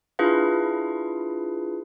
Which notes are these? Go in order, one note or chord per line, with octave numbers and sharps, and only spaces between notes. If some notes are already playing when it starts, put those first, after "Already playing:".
D4 E4 F4 G#4 B4 F5